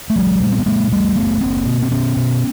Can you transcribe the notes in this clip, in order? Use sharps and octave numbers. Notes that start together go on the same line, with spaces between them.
A3
A#1 F#3 G#3
A#2 G3 A3
C4
B3
A#2 G#3 A#3
E2 G3 A3
F#1 A3 B3
F#1 A#3 C4
B2
C4
B2 B3 C#4
B2